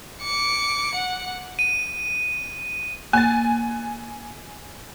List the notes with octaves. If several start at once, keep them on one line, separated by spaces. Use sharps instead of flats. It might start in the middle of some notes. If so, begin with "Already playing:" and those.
D6 C#7
F#5
D#7
A#3 G#5 A6